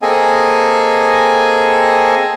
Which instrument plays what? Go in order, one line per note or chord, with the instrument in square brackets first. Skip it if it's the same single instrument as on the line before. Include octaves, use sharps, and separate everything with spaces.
[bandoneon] A#3 C4 G#4 A4 D#5 G#5